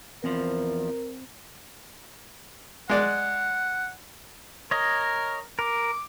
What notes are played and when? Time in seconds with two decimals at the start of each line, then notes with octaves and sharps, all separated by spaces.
0.24 E2 F3 C4 A#4
2.89 G#3 D5 F#5
4.71 A#4 C#5 D#5
5.59 A#4 D6